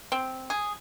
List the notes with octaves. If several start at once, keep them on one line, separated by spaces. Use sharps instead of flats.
C4
G#4